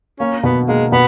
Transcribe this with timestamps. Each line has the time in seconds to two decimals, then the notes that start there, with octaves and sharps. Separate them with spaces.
0.19 A#3 C#4
0.43 B2 B3
0.68 G#3 A#3
0.92 B2 B3